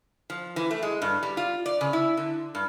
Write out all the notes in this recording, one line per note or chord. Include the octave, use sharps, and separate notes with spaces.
F3
E3
A3
G#3
G2
G3
F4
D5
C#3
E4
D3
G2